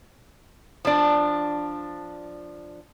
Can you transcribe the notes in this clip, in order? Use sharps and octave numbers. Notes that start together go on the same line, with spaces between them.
F3 D4